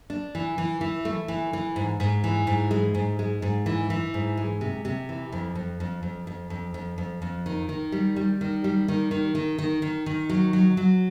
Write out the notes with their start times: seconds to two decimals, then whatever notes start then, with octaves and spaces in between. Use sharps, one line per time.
0.10 D4
0.35 E3
0.58 E3
0.81 E3
1.05 A3
1.28 E3
1.53 E3
1.76 G#2
2.00 G#2
2.24 E3
2.47 G#2
2.71 G#3
2.95 G#2
3.19 G#3
3.42 G#2
3.66 E3
3.90 E3
4.14 G#2
4.37 G#3
4.61 C3
4.85 C3
5.09 E3
5.32 F2
5.55 F2
5.80 F2
6.03 F2
6.27 F2
6.50 F2
6.74 F2
6.98 F2
7.22 F2
7.46 D#3
7.69 D#3
7.92 G3
8.16 G3
8.41 D#3
8.64 G3
8.88 D#3
9.11 D#3
9.35 D#3
9.58 D#3
9.82 D#3
10.06 D#3
10.29 F#3
10.53 F#3
10.77 F#3